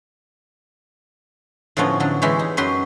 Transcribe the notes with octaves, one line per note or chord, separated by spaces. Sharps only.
A2 D3 F3 B3 C#4 A#5
D3 F#3
E3 G#3 E4 G4 C#5
D#4
F#2 F#3 G4 B4 C6